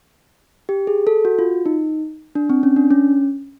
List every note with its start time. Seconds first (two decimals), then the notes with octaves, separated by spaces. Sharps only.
0.69 G4
0.87 G#4
1.07 A4
1.25 F#4
1.39 F4
1.66 D#4
2.35 D4
2.50 C4
2.63 C#4
2.76 D4
2.91 C#4